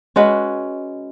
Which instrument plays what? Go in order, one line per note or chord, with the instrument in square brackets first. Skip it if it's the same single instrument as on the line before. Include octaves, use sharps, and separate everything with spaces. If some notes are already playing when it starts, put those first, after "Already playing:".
[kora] G#3 C#4 F#4 B4